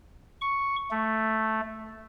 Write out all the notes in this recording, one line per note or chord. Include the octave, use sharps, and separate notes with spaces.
C#6
A3